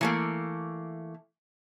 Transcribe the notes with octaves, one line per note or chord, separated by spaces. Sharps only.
E3 A3 A#3